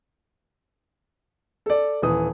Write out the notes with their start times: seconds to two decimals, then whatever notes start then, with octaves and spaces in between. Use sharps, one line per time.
1.66 A4 D5
2.02 D#1 E3 D#6